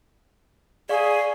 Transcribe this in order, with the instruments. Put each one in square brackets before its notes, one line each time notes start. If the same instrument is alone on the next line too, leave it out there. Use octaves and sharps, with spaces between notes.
[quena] G#4 [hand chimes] D5 F5 C#6